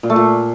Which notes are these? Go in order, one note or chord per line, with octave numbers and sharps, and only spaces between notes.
A#2
A3
A#2